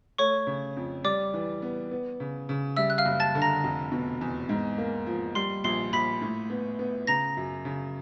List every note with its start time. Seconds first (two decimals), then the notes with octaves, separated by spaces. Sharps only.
0.18 A3 C#5 C#6
0.47 C#3
0.77 F2
1.04 G3 D5 D6
1.34 E3
1.62 B3
1.91 B3
2.20 C#3
2.49 C#3
2.77 G3 E5 E6
2.90 F#6
2.98 F5 F6
3.05 F#1
3.20 A5 A6
3.35 D3
3.42 A#5 A#6
3.64 F1
3.92 B2
4.21 E2
4.49 G#2
4.78 A#3
5.07 F3
5.35 G3 C6 C7
5.64 A#1 C6 C7
5.93 A#1 B5 B6
6.22 A2
6.50 B3
6.79 B3
7.07 C#3 A#5 A#6
7.37 F#2
7.65 C#3